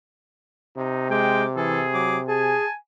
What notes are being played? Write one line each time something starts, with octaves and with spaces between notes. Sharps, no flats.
C3 D#4
G#3 G5 D6
E3 G#4 A4
F#3 D6
G#4 G#5 A5